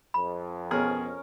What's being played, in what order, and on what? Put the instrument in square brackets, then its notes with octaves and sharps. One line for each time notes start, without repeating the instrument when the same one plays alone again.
[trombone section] F2 [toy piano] B5
[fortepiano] B2 G#4 [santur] C#4 A#4